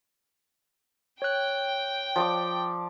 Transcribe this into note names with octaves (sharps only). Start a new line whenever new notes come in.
C#5 G5 F#6
F3 D5 D6